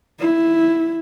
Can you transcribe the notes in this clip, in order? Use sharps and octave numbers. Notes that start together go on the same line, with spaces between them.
E4